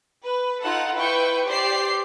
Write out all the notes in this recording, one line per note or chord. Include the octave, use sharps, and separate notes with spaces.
B4
D#4 F4 A4 F#5
E4 B4 G5 C#6
G4 C5 D5 C7